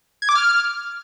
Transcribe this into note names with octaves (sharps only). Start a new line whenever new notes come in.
G#6
D6
F6